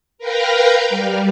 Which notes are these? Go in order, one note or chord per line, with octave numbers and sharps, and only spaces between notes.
A#4 B4 F5 G5 A#5
G3